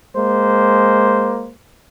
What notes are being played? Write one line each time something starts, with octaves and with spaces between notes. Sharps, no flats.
G#3 A#3 C5